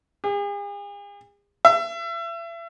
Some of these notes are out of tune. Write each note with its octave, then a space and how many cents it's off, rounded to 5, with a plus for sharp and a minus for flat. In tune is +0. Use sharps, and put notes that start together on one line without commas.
G#4 -45
E5 +35